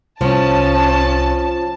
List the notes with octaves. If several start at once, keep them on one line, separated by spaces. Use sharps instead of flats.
C2 F3 C#4 A5